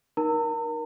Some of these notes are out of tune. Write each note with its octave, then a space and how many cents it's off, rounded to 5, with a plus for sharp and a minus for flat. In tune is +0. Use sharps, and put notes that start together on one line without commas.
D#4 +0 A#4 +20 A#5 -45